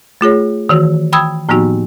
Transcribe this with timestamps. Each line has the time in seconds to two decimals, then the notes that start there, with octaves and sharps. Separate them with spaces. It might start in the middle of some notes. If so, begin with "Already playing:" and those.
0.21 A3 F4 G#4 C#5
0.69 D#3 E3 F#4
1.13 G5 B5 D#6 E6 G#6
1.49 A2 F3 A#3 B3 D#4 F#4